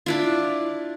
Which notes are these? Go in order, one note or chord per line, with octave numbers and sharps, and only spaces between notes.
D4 E4 F4